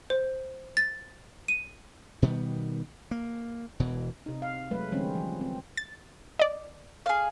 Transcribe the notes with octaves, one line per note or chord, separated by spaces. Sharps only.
C5
A6
D#7
B2 D#3 G3 B3
A#3
E1 B2 E3
C3 D#4
F5
F#3 G#3 A3 B4
D3 E3 G3 G#3 C4 C#4
F3
C4
A6
D5 D#5
G#4 F5